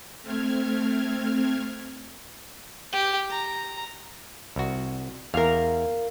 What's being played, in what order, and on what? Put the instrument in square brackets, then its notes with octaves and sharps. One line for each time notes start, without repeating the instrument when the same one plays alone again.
[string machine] A3 C4 F6 G#6
[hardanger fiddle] G4
A#5
[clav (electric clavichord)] C2 F#4
[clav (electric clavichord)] E2 [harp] A#4 F5